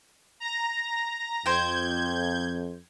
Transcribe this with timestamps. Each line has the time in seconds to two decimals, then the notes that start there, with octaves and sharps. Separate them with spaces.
0.40 A#5 A#6
1.46 F2 C5 G5 G6 G#6